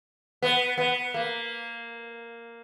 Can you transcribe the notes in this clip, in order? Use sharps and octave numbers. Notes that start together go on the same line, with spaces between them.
B3
B3
A#3